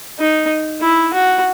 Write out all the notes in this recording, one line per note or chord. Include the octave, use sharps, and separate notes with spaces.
D#4
E4
F#4